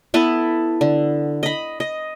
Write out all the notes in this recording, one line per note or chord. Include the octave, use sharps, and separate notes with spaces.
B3 E4 A4 B4
D3
D#5 B5
D#5